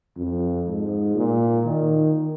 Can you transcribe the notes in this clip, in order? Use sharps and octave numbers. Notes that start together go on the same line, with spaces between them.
F2
G#2
A#2
D#3